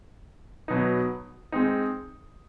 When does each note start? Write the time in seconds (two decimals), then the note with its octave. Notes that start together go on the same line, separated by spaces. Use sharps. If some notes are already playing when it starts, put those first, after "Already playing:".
0.68 B2 F#3 B3 D#4
1.52 G#3 C4 D#4